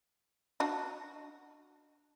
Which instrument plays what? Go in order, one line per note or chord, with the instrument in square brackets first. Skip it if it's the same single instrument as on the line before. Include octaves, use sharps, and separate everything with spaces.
[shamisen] D4 F#4 D#5